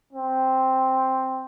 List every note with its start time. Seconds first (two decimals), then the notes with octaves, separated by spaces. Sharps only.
0.13 C4